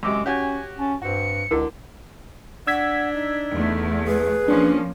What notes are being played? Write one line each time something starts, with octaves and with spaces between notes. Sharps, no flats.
F#2 C3 G#3 D6
C#4 F#4 G4 C#5 G#5
C#4 A5
G2 C4 F#4 C#7
C#2 D3 E4 F#4 A#4
D4 F#5 E6 G#6 B6
D#4
E2 A3
G#4 B4
F3 A#3 C#4 D4